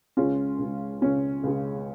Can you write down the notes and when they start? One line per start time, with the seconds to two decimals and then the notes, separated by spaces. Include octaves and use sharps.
0.17 C#2 C#3 G#3 C#4 F4
0.59 C#2 C#3 G#3
1.01 C#2 C#3 G#3 C#4 F4
1.43 C#2 C#3 G#3